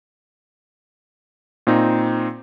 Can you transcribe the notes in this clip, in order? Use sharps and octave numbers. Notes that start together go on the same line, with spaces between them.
A#2 C4 D#4